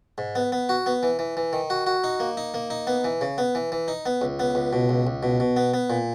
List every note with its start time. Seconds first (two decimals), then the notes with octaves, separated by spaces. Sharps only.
0.18 G#2
0.35 B3
0.52 B3
0.69 F#4
0.86 B3
1.03 E3
1.19 E3
1.37 E3
1.53 D#3
1.70 F#4
1.87 F#4
2.04 D#4
2.20 A#3
2.37 D#4
2.54 A#3
2.70 D#4
2.87 B3
3.04 E3
3.21 C#3
3.38 B3
3.55 E3
3.72 E3
3.88 D#4
4.06 B3
4.21 C#2
4.39 B3
4.55 C#2
4.73 B2
4.89 C#2
5.07 C#2
5.23 B2
5.40 B2
5.57 B3
5.74 B3
5.90 A#2